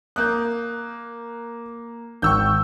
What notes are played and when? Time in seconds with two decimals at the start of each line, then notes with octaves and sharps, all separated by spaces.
0.16 A#3 D#6 F#6 G6
2.22 G#1 G5 C#6 E6 G6